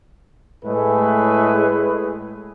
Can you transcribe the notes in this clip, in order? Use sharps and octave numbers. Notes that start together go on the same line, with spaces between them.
A2 G#3 A3 G#4 B4